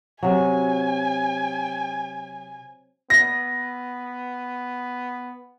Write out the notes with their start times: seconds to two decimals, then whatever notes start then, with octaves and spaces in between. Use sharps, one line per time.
0.23 C3 F#3 G#5
3.10 B3 A#6